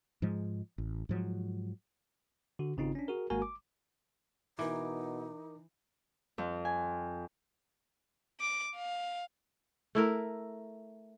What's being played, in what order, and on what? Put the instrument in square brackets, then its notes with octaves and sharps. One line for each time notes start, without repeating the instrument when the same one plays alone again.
[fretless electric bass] G#2 F3 G#3
A1
G#2 F3 F#3
[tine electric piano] D3 F#4
G#1 C#3 C4 D#4 F4
C#4 D4
F#4 G#4 A#4
G#1 G#3 A#3 F#4 A#4 G#5
D6
[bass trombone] B2 [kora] E3 [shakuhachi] D#4 [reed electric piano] A#4 D6
[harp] F2
G#5
[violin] D6
F5
[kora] A3 E4 A#4